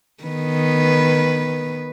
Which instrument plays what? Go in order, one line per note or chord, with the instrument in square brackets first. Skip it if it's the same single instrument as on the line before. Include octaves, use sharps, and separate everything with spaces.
[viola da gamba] D#3 B3 B4